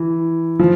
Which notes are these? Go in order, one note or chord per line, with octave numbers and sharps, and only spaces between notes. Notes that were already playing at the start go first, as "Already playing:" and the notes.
Already playing: E3
F3